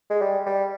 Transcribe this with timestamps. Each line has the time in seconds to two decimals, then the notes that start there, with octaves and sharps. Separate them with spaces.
0.10 G#3
0.21 G3
0.46 G3